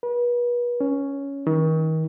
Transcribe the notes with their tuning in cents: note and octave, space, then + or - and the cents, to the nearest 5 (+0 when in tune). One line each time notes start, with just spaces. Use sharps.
B4 -35
C#4 +5
D#3 +35